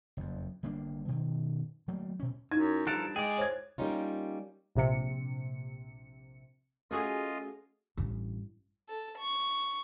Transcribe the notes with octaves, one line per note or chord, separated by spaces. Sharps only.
F#1 F2
G1 G3 A#3 D4
B2 D#3
F#3 A3 A#3
B2 C#4
F#2 D#4 E4 G#6
G2 F3 A4 A#4 F#6 A6 D7
G#3 G#4 D5 G5
C5 C#5 G#6
G3 A#3 C#4 D#4 F4
A#1 C3 C#7
A3 C#4 F4 F#4 G#4 A4 D#5 G#5
A1 G2
A4
C#6